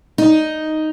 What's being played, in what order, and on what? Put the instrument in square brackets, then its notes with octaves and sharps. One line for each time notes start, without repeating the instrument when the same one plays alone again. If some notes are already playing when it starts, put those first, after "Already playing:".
[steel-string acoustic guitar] D#4